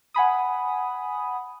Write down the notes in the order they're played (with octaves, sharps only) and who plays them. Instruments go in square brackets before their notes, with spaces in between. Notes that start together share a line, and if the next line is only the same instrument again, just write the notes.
[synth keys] F#5 G#5 B5 D#6